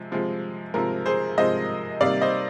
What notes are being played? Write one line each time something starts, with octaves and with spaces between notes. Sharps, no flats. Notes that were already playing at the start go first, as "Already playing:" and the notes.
Already playing: C3 F3 G#3
C3 F3 G#3
C3 F3 G#3 A#4
G#4 C5
C3 F3 G#3 C5 D#5
C3 D#3 G3 A#3 D5 F5
C5 D#5